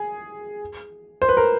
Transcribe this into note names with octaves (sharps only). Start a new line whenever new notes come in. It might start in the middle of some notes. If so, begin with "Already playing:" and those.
Already playing: G#4
C5
B4
A#4